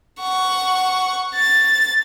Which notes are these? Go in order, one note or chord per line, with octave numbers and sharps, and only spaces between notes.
F#5 C#6
A6